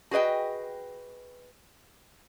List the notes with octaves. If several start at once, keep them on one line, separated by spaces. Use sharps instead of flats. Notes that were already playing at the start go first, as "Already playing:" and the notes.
F#4 G#4 B4 D#5 G5